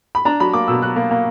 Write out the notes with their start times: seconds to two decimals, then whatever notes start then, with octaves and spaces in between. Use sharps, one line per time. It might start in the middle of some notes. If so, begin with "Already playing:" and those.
0.15 B5
0.25 D4 A#5
0.40 F#3 B5
0.53 A#3 D6
0.68 B2 E6
0.83 F#3 F#6
0.96 A#3
1.11 A#3